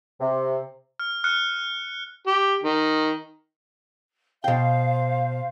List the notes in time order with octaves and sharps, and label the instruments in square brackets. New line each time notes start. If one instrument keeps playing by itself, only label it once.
[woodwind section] C3
[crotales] F6
F6 F#6 C#7
[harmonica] G4
D#3
[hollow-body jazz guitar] B2 G5 [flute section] C5 F5